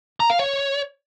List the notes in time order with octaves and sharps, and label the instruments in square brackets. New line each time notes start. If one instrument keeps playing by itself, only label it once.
[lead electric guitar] A#5
F5
C#5